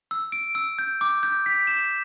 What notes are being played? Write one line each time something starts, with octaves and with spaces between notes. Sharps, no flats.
E6
D7
E6
G6
D6
G6
B6
E7